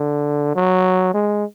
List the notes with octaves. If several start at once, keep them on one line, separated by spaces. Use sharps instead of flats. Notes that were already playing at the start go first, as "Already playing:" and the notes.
Already playing: D3
F#3
G#3